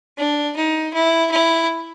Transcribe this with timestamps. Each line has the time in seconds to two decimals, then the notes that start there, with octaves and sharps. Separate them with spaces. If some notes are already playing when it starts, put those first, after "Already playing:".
0.18 D4
0.56 D#4
0.93 E4
1.31 E4